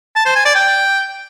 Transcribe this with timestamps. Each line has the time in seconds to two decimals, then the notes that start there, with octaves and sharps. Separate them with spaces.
0.16 A5
0.26 C5
0.35 G#5
0.45 D5
0.55 G5